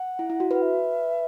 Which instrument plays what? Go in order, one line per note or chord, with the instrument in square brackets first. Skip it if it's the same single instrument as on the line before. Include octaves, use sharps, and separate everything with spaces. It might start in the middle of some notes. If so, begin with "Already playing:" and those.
Already playing: [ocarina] F#5
[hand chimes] E4
E4
F#4
B4
[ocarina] E5